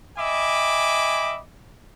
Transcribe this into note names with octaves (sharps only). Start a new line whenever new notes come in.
D#5 E5 G5 G#5 B5 D6